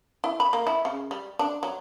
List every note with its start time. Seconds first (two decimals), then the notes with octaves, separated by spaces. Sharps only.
0.24 E4
0.40 B5
0.53 A#3
0.67 E4
0.85 C#3
1.11 G3
1.39 D4
1.63 F#3